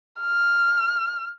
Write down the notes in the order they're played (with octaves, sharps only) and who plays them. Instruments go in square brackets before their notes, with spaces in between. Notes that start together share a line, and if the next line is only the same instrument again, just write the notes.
[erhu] F6